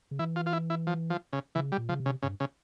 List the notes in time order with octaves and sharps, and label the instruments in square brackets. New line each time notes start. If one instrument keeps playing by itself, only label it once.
[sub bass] C#3
[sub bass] E3 [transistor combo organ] E4
[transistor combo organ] F4
F4
E4
E4
F3
F3
C#3
[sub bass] C#3 [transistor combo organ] E3
[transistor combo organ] G3
[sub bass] A#2
[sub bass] C#3 [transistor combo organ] F3
[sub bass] C3
[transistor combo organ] C#3
[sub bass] G2 [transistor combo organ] C#3
[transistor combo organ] C#3